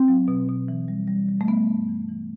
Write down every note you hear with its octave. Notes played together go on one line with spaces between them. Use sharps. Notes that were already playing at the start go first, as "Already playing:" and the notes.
Already playing: C4
F#3
B2
B2
E3
G3
G3
G3
A3
G3 B3
G2
E3
E3